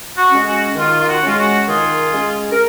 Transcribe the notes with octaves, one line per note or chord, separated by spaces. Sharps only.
F#4
G#3 C#4
F#4
D#3 F4
F4
F#4
G#3 C#4 F4
F#4
D#3 F4 G#4
G#3 C#4
A#4